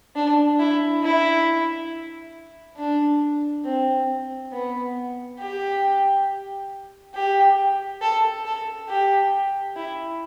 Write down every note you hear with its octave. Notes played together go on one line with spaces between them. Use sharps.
D4
E4
E4
D4
C4
B3
G4
G4
A4
A4
G4
E4